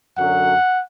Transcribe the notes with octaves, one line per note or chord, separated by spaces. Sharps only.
F#2 D3 F#3 F#5